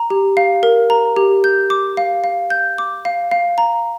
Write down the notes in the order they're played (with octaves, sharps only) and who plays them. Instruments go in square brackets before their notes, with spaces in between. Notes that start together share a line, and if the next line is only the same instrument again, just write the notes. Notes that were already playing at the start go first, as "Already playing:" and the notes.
Already playing: [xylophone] A#5
G4
F5
A#4
A#5
G4
G6
D6
F5
F5
G6
D6
F5
F5
A#5